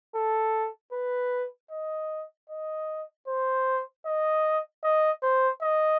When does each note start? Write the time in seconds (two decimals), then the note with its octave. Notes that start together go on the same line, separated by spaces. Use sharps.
0.15 A4
0.93 B4
1.71 D#5
2.49 D#5
3.28 C5
4.06 D#5
4.84 D#5
5.23 C5
5.62 D#5